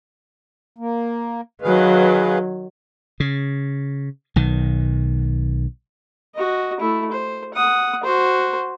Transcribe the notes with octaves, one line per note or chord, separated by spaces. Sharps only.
A#3
D#3 F#3 G#4 B4 F5
C#3
B1 D#3
F#4 D#5
A3 E4
C5
F#5 D#6
F#4 C5